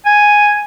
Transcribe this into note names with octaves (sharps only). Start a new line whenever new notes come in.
G#5